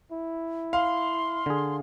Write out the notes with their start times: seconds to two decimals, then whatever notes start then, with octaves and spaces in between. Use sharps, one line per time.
0.12 E4
0.73 F5 C6
1.46 D3 G#4